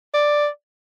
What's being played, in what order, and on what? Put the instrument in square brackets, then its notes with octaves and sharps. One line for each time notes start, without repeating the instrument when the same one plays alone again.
[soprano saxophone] D5